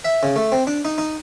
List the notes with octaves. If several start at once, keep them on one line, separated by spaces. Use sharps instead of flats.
E5
C#3
A3
C4
D4
D#4
D#4